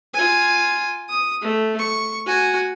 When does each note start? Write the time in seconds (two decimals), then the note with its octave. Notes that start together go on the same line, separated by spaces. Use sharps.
0.14 F4 G#5
1.09 D#6
1.41 A3
1.79 C#6
2.26 F#4 G#5